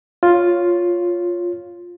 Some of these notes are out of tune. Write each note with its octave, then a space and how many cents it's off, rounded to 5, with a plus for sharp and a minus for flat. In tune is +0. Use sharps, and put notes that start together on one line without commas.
F4 +5 C#5 +0